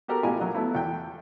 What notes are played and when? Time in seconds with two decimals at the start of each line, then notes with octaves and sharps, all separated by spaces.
0.08 F#4 G4 A4 A#4
0.23 A1 E4 F4 G4 G#5
0.40 A#1 F#3
0.54 F#3 A3 B3 E4
0.75 E2 G5